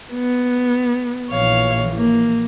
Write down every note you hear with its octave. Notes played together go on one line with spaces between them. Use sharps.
B3
A#1 E3 C#5 F5
A#3